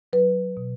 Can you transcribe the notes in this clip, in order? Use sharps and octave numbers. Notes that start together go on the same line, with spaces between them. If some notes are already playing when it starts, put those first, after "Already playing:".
F#3 B4
B2